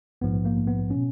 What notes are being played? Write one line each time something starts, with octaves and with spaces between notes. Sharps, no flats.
A#1 G#2 F3 B3
A#3
B3
B2 C#4